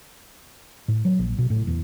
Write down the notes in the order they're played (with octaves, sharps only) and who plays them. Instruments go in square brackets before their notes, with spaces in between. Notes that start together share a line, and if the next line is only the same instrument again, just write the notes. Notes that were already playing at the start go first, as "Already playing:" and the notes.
[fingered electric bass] A2
F#3
A#1
B2
A2
E2